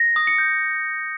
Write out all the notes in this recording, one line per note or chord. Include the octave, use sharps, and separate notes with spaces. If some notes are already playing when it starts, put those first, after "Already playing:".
Already playing: A#6
D#6
C#7
G6